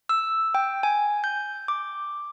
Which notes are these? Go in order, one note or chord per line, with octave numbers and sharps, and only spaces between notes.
E6
G5
G#5
G6
D6